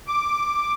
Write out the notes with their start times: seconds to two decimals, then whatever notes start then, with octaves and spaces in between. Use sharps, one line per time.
0.08 D6